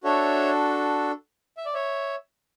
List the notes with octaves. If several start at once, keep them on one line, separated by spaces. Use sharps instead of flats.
D4 F#4 A4 C#5 E5
E5
D5
C#5 E5